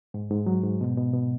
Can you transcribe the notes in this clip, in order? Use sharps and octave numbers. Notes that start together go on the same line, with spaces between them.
G#2
G#2
F#3
G#2
B2
B2
B2